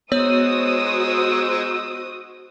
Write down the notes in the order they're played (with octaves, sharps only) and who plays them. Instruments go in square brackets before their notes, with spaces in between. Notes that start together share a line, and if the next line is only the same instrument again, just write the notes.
[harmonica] G#3 D#4 E6 [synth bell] B3 C#5 [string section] F#4 C5 D#6